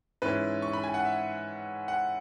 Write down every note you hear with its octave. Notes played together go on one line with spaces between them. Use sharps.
G#2 E3 C#4 E4 B4
C#6
B5
G#5
F#5
E5
F#5